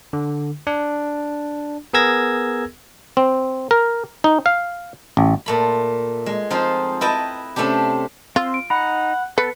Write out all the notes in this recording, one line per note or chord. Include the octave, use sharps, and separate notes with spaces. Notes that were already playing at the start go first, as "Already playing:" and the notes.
D3
D4
B3 G#4 A#4 E6 G#6 A#6
C4
A#4
D#4
F5
A1
A#2 A3 B5
G#3
F3 C4 D#4 F4
E4 B4 D#5 G5 A5
C3 A3 C#4 D4 G4
C4 F4 C6 E6
D7
D#4 F#5 A#5 B5
B3 A4 B4 C#7